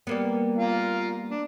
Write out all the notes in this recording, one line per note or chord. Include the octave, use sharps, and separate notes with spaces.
G3 A#3 B3
F4 F5 A#5
D4